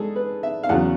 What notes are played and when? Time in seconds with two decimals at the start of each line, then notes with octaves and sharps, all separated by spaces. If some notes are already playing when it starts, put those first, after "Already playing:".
Already playing: G#2 G#3 G#4 A4
0.16 B4
0.43 E5
0.64 F5
0.69 E2 C#3 F#3 F#5